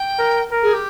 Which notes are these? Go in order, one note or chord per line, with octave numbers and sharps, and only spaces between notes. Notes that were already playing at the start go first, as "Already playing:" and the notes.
Already playing: G5
A#4
A#4
G#4
G4